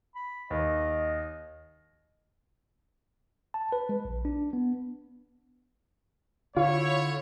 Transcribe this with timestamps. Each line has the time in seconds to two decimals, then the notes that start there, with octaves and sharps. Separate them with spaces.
0.15 B5
0.50 D#2 D#5
3.54 A5
3.72 B4
3.89 G#3
4.05 A#1
4.25 D4
4.53 B3
6.56 D3 E4 F4 C#5